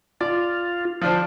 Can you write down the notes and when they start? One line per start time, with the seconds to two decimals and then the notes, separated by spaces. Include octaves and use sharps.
0.21 F4 D5
1.02 F3 D4 C5